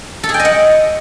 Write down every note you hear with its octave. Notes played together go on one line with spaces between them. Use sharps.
A4
G#4
G5
D#5
F#5